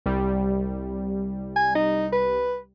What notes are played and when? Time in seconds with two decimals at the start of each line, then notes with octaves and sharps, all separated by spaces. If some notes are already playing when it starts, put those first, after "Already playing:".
0.06 C2 G3
1.56 G#5
1.75 D#4
2.13 B4